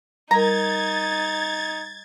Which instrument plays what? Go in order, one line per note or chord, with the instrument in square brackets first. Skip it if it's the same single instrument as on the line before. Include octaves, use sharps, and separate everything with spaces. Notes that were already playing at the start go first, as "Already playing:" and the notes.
[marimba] G3 A#4 [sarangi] D#4 [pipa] A#5 [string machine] G#6 A6